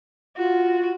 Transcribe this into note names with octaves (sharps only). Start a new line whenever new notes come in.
F4 F#4